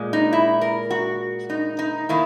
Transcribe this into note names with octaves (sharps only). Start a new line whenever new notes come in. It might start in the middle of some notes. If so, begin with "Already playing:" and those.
Already playing: A#2 G#3
D#4
E4
A#4
F#4
D#4
D#4
D#3 A#3 E4